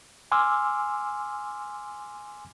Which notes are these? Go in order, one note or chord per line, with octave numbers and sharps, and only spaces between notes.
G#5 C6 D6 E6 F6